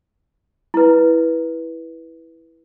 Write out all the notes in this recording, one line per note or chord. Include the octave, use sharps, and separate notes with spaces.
E4 B4